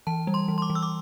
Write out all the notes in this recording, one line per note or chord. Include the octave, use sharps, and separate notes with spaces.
E3 A5
G3
C6
E3
C6
D6
E3
E6
D6